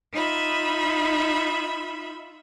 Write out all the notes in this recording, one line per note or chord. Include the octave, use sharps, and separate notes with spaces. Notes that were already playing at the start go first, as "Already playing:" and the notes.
D#4 F4 E5 B5